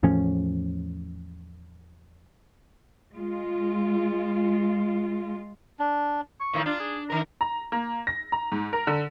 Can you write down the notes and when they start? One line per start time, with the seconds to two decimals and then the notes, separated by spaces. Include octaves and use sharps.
0.03 E2 A2 F3 C#4
3.15 G#3 F4
5.79 D4
6.40 C#6
6.53 A2 D#3 E3
6.66 D4 F4
6.80 G#4
7.10 D#3 A#4 A#5
7.41 A#5
7.72 A#3
8.07 A#6
8.32 A#5
8.52 G#2
8.73 A#4
8.87 D3